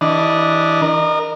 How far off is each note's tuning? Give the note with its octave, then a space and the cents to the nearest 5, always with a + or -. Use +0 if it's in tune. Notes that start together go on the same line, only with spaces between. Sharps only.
E3 -20 D4 +0 D#5 +0
A#4 +0 D#5 -35